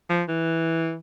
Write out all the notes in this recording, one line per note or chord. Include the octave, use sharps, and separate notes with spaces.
F3
E3